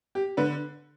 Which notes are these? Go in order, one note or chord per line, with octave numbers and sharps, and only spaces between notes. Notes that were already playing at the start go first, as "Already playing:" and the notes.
G4
D3 B4